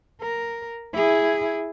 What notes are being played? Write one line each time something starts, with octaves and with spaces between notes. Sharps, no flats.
A#4
E4 G#4